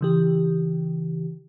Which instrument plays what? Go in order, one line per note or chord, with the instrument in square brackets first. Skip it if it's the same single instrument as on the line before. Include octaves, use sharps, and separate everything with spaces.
[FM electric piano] C#3 E3 G4